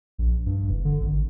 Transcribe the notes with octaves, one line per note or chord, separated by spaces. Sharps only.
A#1
G2
F#1
D3
G#1